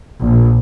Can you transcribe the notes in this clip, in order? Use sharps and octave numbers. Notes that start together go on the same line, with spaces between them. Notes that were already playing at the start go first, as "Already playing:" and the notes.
A#1